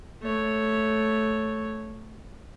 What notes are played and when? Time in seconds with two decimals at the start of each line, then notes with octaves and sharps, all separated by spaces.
0.22 A3 C#5